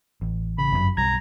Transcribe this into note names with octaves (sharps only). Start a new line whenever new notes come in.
A1
C#3 B5
G1 F#2 A#2 F#3
B1 G3 A#5 G#6